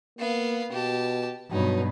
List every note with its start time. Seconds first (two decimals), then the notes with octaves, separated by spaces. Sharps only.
0.18 A#3 B3 F5
0.72 B2 G4 A5
1.52 G2 B2 F#3 D#4